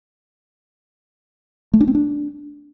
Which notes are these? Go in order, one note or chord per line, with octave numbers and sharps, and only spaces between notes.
A3
D4
C4
D4